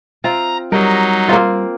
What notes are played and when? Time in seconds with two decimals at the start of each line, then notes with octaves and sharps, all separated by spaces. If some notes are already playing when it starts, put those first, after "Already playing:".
0.24 C4 F4 A#5
0.72 F#3 G3 D#4 A#4
1.28 A#3 C4 F4